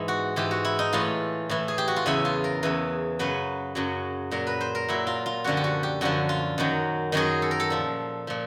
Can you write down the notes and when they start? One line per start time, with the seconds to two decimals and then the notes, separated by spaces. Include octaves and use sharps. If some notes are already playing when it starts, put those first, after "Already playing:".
Already playing: G#2 E3
0.08 F#4
0.36 G#2 E3 G4
0.51 F#4
0.65 E4
0.79 D#4
0.93 A2 E3 F4
1.50 A2 E3
1.68 G#4
1.78 G4
1.88 F#4
1.96 F4
2.06 E2 C#3 E3 E4
2.25 F4
2.44 A#4
2.63 E2 C#3 E3
3.19 F#2 C#3 F#3 B4
3.75 F#2 C#3 F#3
4.31 A#2 F#3 A#4
4.47 B4
4.61 C5
4.75 A#4
4.89 A#2 F#3 E4
5.07 F4
5.26 F4
5.44 F#2 D3 F3 F#4
5.57 G4
5.64 F#4
5.83 G4
6.01 F#2 D3 F3 F#4
6.29 F4
6.58 F#2 D#3 F#3
7.12 F#2 D#3 F#3 G#4
7.42 A4
7.51 A#4
7.60 A4
7.70 A#2 F3
8.27 A#2 F3